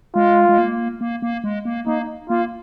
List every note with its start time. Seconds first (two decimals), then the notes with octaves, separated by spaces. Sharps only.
0.15 G#3 F4
0.49 G#3
0.58 A#3
1.01 A#3
1.22 A#3
1.44 G#3
1.65 A#3
1.86 A#3 D#4
2.29 A#3 F4